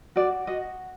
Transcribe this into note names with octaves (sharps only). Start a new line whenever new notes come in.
F#4 D5
F#4 D#5